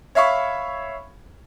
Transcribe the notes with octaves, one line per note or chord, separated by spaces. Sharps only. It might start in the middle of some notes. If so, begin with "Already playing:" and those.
C#5 E5 F5 B5 C#6